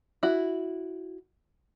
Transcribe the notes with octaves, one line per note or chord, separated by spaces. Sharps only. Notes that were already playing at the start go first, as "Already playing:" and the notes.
E4 F#4